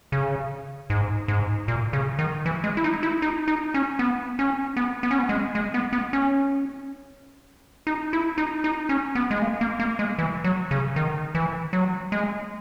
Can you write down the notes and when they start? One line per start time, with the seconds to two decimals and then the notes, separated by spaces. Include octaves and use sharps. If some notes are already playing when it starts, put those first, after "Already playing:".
0.12 C#3
0.90 G#2
1.28 G#2
1.68 A#2
1.93 C#3
2.19 D#3
2.46 E3
2.64 G#3
2.77 E4
2.84 D#4
3.03 E4
3.22 D#4
3.48 D#4
3.74 C#4
3.99 B3
4.39 C#4
4.77 B3
5.03 B3
5.11 C#4
5.19 B3
5.29 G#3
5.55 G#3
5.74 B3
5.93 B3
6.13 C#4
7.87 D#4
8.13 E4
8.38 D#4
8.64 D#4
8.89 C#4
9.15 B3
9.31 G#3
9.42 A#3
9.61 A#3
9.80 A#3
9.99 G#3
10.19 E3
10.44 F#3
10.71 C#3
10.96 D#3
11.35 E3
11.73 F#3
12.12 G#3